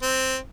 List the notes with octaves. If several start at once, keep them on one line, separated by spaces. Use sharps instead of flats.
C4